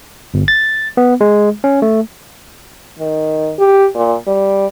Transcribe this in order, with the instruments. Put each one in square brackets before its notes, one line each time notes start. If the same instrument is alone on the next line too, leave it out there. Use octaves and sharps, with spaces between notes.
[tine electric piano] G1
A6
B3
G#3
C#4
A3
[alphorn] D#3
G4
A#2
G3